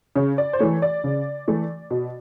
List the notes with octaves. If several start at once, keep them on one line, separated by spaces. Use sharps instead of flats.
C#3 C#5
D5
C5
E3 A3 C#5
D5
C#3
E3 A3
B2